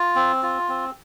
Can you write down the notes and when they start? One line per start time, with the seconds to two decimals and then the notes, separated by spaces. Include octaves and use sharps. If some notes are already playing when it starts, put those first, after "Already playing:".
Already playing: F4
0.15 C4
0.43 F4
0.69 C4